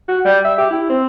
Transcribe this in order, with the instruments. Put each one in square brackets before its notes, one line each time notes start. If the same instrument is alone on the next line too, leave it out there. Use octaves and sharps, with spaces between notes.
[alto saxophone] F#4
G3
E5
G4
E4
C4